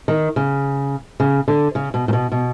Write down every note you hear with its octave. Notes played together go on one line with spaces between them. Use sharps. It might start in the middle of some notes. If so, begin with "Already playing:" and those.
D#3
C#3
C#3
D3
C#3
B2
A#2
B2
B2